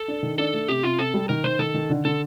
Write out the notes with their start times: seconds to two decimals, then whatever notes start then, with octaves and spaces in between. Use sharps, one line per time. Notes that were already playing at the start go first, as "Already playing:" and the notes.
Already playing: A4
0.08 D4
0.23 D#3
0.38 D4 A4
0.54 A3
0.68 C3 G4
0.83 C3 F4
0.99 C3 A4
1.14 G3
1.29 D#3 A#4
1.44 D#3 C5
1.59 D#3 A4
1.74 D#3
1.90 D3
2.05 D3 A4